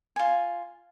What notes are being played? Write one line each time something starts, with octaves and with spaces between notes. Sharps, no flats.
F4 G#5